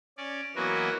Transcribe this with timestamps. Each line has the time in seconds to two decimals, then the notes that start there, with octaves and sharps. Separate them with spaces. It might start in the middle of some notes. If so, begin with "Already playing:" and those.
0.17 C#4 D5
0.55 E3 F#3 A#3 B3 F#4 D#5